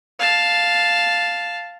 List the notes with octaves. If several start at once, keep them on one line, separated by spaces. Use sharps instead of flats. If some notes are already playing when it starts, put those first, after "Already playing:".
F5 A5